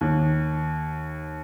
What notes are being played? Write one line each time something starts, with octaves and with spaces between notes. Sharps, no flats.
D#2